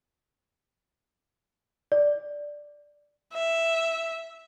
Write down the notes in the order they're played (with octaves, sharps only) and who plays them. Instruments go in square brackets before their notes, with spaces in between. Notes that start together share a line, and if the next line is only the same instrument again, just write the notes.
[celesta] D5
[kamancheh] E5